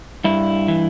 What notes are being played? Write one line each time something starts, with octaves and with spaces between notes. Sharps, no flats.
G2 E4
E3